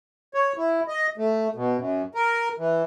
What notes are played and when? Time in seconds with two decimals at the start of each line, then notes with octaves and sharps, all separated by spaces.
0.34 C#5
0.57 E4
0.88 D#5
1.18 A3
1.56 B2
1.77 F#2
2.15 A#4
2.58 E3